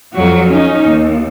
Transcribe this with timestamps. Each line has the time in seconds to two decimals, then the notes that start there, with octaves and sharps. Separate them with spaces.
0.13 F2 F#3 F#4
0.49 C#4 D#4
0.86 D#2